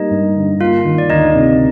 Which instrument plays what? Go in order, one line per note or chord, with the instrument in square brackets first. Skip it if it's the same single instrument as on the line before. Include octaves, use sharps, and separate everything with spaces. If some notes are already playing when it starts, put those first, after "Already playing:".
Already playing: [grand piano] G3 A#3 [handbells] D#4 D#5
[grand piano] G2
D3
[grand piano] A#3 [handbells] F4 F5
[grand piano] D#3
[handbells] D5
[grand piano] D2 [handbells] D#4 D#5
[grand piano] C3